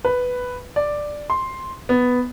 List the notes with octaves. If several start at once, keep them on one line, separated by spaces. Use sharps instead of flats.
B4
D5
C6
B3